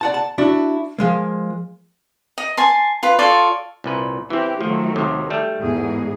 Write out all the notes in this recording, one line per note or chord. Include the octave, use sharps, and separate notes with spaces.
D5 F#5 A5
A5
D4 E4 F#4
F3 G#3 A#3
D#5
G#5 A5 C6
F4 B4
F4 A4 C#5 D5
C2 A#2 B4
E3 C4 G4
D#3 F3 F#3 A3
D#2 C3
G3 A3
E2 G#2 G#4